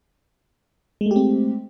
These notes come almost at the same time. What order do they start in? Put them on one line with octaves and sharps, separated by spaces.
G#3 A3 G4 C4